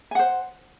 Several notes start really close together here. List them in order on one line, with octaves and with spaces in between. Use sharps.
G#5 F#5 C5